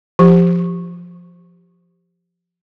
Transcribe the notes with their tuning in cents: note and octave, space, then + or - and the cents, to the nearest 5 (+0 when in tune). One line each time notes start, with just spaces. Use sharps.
F3 +0 G4 +0